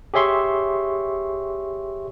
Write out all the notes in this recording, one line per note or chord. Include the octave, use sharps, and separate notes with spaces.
G4 G#4 C#5 E5 C6 C#6